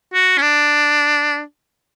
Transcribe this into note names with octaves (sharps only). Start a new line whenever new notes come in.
F#4
C#4
D4